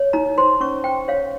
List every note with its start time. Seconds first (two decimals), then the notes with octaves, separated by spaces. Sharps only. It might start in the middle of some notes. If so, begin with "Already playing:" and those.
Already playing: C#5
0.13 D#4 A#5
0.38 C5 C6
0.61 C#4 C#6
0.84 C5 G5
1.08 C#5 F5